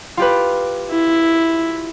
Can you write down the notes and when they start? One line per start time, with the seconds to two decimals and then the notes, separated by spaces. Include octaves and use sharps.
0.17 F4 G4 B4
0.90 E4